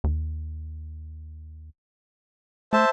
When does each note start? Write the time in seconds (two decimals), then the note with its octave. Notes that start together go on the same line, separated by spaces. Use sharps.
0.04 D#2
2.73 A3 C5 E5 A5